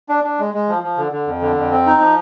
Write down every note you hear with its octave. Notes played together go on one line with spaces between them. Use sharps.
D4
D4
G#3
G#3
F3
F3
D3
D3
F2
D3
F2
C4
D#4
F3